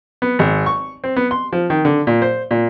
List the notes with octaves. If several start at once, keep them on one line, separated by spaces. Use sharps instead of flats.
B3
G#1
C#6
C4
B3
C6
F3
D#3
D3
A#2
C5
A#2